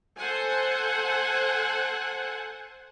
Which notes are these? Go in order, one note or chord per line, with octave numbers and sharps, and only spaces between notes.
A4 C5 F#5 G#5